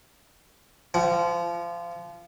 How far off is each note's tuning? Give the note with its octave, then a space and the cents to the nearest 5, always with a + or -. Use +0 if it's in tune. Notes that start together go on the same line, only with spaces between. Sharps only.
F3 -25 F#5 +30